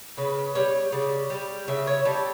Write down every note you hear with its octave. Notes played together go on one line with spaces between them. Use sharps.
C#3 B4
G3 C#5
C#3 D5
G3
C#3 E5
C#5
G3 A4